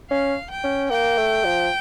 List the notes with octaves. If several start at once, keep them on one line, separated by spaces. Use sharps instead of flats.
C#4 F5
G5
C#4
A#3 G5
A3
F3